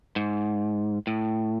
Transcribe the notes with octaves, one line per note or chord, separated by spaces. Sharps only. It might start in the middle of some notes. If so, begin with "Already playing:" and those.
G#2
A2